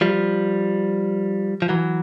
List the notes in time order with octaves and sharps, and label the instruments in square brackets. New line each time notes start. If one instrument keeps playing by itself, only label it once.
[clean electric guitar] F3 G3
F3
E3 F#3